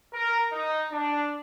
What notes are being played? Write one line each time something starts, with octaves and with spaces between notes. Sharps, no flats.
A#4
D#4
D4